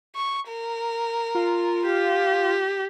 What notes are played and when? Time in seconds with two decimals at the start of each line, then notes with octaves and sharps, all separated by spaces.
0.15 C#6
0.48 A#4
1.35 F4
1.85 G4